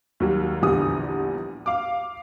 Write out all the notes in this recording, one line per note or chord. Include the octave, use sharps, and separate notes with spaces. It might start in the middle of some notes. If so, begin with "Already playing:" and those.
D#2 F#3 G3
A#1 E2 D3 G3 D#6
F5 D6